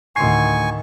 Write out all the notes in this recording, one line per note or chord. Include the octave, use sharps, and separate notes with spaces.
D2 A2 D#3 G#5 C6 C#6 C7